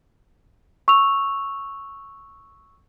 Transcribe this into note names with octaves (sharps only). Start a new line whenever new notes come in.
C#6 E6 F7